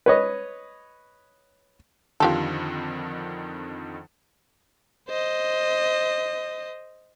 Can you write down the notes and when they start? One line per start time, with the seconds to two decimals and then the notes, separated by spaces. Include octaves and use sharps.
0.06 B4 C#5 D#5
2.20 F2 D3 D#3 F4 G4 A4
5.09 C5 D#5